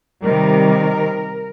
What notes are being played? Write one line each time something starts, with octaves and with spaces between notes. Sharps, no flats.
C3 D#3 G3 A#4